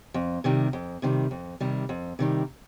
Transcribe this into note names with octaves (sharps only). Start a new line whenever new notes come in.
F2
C3 D#3 G3
F2
C3 D#3 G3
F2
C3 D#3 G3
F2
C3 D#3 G3